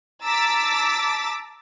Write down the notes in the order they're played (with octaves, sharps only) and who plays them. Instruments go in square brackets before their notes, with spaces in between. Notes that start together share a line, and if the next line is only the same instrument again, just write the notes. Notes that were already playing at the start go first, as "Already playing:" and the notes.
[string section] A5 A#5 D6 E6 A6 B6